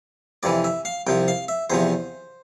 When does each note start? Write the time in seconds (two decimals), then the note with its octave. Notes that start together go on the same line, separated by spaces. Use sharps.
0.43 F2 C3 E3 D5
0.64 E5
0.85 F5
1.07 C2 C3 F3 G5
1.28 F5
1.48 E5
1.70 E2 C3 F3 C5